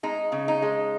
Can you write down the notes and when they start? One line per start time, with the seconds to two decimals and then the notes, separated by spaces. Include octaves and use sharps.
0.03 G#3 D#4
0.32 C#3
0.48 D#4
0.62 G#3